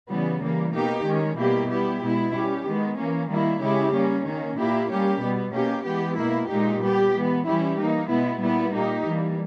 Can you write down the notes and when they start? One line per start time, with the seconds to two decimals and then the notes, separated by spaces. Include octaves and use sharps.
0.09 C#3 E3 G3 B3
0.42 E3 G3 A#3
0.74 B2 A#3 D#4 G4
1.05 D#3 G#3 C#4
1.37 B2 G3 A#3 E4 G4
1.70 G3 B3 E4 G4
2.02 B2 G#3 B3 E4
2.34 G3 C#4 G4
2.66 D#3 G#3 B3
2.98 E3 A#3 C#4
3.30 D#3 G3 A#3 E4
3.62 C#3 G#3 C#4 E4 G4
3.93 G3 A#3 C#4
4.26 D#3 A#3 C#4
4.58 A#2 A#3 E4 G4
4.90 G3 A#3 C#4 G4
5.21 B2 G3 B3
5.53 B2 A#3 C#4 G4
5.85 E3 G#3 B3 G4
6.18 B2 A#3 E4
6.49 A#2 G#3 D#4 G4
6.82 G3 B3 G4
7.14 E3 G#3 B3
7.46 E3 G3 C#4 E4 G4
7.78 E3 A#3 D#4
8.10 B2 G#3 B3 E4
8.41 A#2 G3 B3 E4
8.74 A#2 A#3 D#4 G4
9.06 E3 G3 A#3